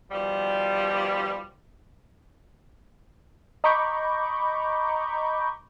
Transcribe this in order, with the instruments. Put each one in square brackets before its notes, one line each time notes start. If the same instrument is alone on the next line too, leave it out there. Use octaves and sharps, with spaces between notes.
[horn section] B2 D#3 F3 G3
[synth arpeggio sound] D#5 A#5 B5 C#6 D6 G6